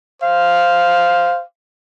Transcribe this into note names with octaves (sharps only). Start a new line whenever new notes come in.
C5 F5